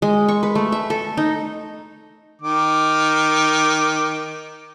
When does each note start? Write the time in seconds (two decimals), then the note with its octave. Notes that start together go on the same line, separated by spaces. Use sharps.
0.02 G#3
0.28 C#6
0.43 B4
0.55 A3
0.72 E5
0.90 A4
1.17 D#4
2.41 D#3 D6